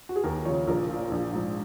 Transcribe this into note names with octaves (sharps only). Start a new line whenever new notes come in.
F#4
G#4
D#2 A#4
C#3 F3 C#5
A#1 A#4
A#2 F3
A#1
G#2 F3